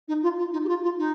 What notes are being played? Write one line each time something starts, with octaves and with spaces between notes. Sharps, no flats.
D#4
F4
F4
D#4
G4
F4
F4
D#4